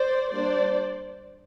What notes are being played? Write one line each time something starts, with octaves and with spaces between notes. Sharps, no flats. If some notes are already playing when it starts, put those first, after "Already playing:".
Already playing: C5 D5
G3 A#3 D4 C5 D5